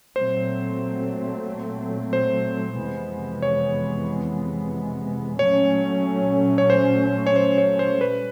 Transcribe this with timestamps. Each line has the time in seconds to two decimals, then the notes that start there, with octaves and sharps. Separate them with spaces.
0.16 A#2 F#3 A3 C4 C5
2.13 C5
2.78 F2 C3 E3 G#3 B3
3.42 C#5
5.39 A#2 F#3 A3 C#4 C#5
6.58 C#5
6.70 C5
7.27 C#5
7.36 C5
7.58 C#5
7.79 C5
8.01 G3 B4